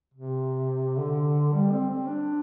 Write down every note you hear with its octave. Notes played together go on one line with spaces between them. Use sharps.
C3
D3
G3
C4
C4
D4